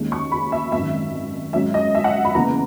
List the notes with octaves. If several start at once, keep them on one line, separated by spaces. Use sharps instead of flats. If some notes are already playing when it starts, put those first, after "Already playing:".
Already playing: D#2 D#3 G#3 C#4
C#6
B5
E5
G#1 F#2 D#3 E5
G#2 F#3 C#4 E5
D#5
E5
F#5
B5
E2 C#3 E3 A#3 A#5